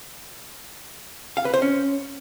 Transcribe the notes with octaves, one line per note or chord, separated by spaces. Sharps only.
F5
B4
C5
C#4